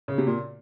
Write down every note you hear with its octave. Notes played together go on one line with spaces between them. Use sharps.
C#3
C3
A#2